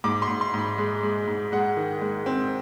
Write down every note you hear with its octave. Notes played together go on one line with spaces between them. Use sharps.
G#2 D6
C6
G#2
C6
G#2
B5
G#3
G#3
G#2
G#3 F#5
D#3
G#3
C4